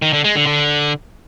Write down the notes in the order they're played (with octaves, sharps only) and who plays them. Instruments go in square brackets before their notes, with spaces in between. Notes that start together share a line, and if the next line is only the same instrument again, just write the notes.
[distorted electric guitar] D#3
D3
G#3
D3
D3